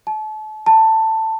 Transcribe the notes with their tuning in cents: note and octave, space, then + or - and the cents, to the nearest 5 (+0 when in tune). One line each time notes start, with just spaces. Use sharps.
A5 -35
A5 +15